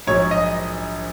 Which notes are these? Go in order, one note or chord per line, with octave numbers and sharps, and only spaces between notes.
A#1 G#2 F#3 C#5
D#5